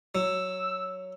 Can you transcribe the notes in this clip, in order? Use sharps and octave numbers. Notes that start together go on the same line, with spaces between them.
F#3 E6